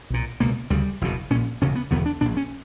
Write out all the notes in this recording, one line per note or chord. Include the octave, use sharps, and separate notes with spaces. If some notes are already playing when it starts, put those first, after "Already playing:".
B1 A#2
C#2 B2 A#3
D2 C#3 G3
F#1 E2 B2
A#1 A#2 C#4
E1 D2 C#3 C#4
B3
E1 E2 D3 B3
D4
A#1 A#2 D4
C#4